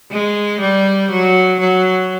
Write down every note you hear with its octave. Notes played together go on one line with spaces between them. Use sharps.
G#3
G3
F#3
F#3